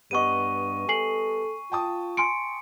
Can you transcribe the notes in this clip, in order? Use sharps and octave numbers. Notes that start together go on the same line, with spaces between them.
G2 G3 B3 D#5 C#6 D#7
A4 G#5 C7 F#7
F4 G5 A5 D#6
G#5 C6 C#7 D7